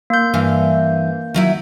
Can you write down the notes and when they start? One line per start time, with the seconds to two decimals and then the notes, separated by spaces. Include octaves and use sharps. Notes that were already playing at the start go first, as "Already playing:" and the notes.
0.10 A#3 G6
0.34 G2 E3 F5
1.34 D#3 F#3 E4